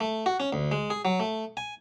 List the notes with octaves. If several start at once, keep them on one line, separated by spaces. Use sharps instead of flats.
A3
F#4
C#4
D2
G#3
G#4
F#3
A3
G#5